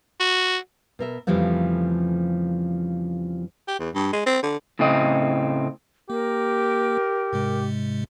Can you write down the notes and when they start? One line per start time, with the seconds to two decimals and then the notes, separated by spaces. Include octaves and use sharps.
0.20 F#4
0.99 B2 A#4 E5
1.27 F2 C#3 E3 F3 G3 A3
3.68 G4
3.79 E2
3.95 G2
4.13 G#3
4.26 C4
4.43 D3
4.79 A2 C#3 A3 C4 D#5
6.10 A#3 G4 A#4
7.33 G#2 C3 G#3